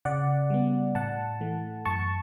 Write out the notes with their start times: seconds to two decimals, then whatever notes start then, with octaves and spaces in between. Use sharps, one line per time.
0.05 C#3 D5 F#5
0.50 G3 B3
0.95 A2 F#5 A5
1.41 E3 A3
1.85 F#2 A5 C#6